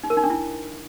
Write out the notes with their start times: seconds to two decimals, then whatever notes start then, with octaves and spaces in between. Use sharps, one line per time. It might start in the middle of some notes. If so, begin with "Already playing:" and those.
0.03 D#4
0.10 A#4
0.17 D#4
0.23 D4
0.30 E4